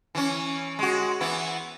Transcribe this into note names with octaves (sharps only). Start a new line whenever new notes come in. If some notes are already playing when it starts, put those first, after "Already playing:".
E3 C#4
G#3 F#4
E3 B3 E4